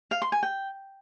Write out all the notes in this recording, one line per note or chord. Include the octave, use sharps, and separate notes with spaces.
F5
C6
G#5
G5